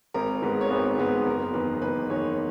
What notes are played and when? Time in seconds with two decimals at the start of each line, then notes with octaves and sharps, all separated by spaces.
0.14 G#1 A#4
0.42 G#2 D#3 G#3 B3
0.61 C#5
0.70 G#1 B4
0.98 G#2 D#3 G#3 B3
1.26 F#1 A#4
1.54 E2 D#3 B4
1.82 F#1 B4
2.09 E2 D#3 C#5